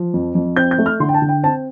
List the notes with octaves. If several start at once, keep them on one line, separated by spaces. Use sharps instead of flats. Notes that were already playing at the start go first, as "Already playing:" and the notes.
Already playing: F3
F2
F2
C4 G6
G6
A3
F6
D3 C6
G5
A5
D3
G5
C4 A5